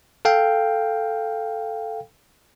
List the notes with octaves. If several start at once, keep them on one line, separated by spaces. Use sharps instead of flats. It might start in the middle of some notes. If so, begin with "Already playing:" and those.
A4 F5 G5